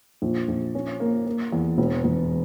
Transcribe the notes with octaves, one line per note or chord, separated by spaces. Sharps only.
A#1
A#1
C#4
A#3
A#3
E2
E1
E1